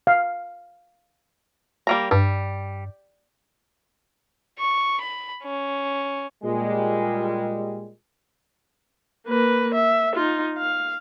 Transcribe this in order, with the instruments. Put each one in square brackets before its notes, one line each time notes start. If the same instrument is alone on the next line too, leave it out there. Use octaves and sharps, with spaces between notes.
[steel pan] F5
[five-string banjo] G3 A#3 A#5
[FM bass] G2 [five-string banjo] G3
[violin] C#6
B5
C#4
[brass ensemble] A#2 G3 G#3
[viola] A#3 B4
E5
D#4 F4
F5